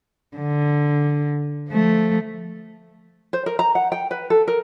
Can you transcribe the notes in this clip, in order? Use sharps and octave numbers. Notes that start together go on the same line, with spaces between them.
D3
F3 A3
C5
A#4
A#5
F#5
G5
B4
A4
A#4